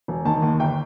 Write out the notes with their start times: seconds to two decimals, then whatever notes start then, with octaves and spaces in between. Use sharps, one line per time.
0.08 E1
0.25 D#3 A5
0.42 D#2
0.60 G1 G5